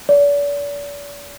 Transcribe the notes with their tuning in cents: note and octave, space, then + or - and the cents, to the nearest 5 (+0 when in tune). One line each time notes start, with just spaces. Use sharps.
D5 -40